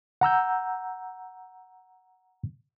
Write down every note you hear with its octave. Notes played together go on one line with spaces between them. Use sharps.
F#5 A#5 E6 G6